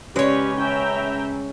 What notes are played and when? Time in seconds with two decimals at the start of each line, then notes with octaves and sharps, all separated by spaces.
0.16 C#3 G#3 C#4 G4 B4 C#5
0.60 C#4 E5 G5 A#5